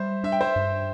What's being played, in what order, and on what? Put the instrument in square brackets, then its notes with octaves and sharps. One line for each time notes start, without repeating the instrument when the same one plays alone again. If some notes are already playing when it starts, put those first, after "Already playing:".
Already playing: [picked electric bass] G3 [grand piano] C5 E5
[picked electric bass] D4 [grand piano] E5
[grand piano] G5
C5 E5
[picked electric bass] G2